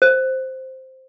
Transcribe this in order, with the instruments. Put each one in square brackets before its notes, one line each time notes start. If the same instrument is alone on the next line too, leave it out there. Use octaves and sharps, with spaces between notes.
[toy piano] C5